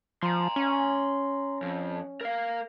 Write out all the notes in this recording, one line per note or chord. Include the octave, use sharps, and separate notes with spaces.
F3 A#5 C6
C#4
F2
A#4 F5